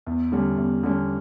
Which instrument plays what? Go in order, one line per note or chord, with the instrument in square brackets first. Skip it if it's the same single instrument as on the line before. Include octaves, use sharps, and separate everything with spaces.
[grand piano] E2
D3 G3 C#4
E2
D3 G3 C#4